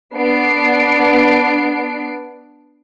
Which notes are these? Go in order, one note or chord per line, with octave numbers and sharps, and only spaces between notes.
B3 D4 C7 D7